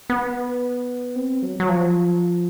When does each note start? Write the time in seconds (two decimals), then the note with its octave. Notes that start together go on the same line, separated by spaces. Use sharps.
0.10 B3
1.16 C4
1.43 F#3
1.60 F#3
1.69 F3